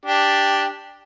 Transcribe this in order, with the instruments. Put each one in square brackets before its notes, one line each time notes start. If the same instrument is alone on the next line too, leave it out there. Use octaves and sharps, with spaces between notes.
[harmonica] D4 G4